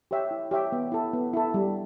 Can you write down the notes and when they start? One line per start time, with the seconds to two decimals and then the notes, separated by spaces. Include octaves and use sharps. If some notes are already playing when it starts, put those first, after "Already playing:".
0.11 G4 C#5 E5 G5
0.31 E4
0.51 G4 C#5 E5 G5
0.72 B3
0.92 E4 A4
1.13 B3
1.33 E4 A4
1.54 G3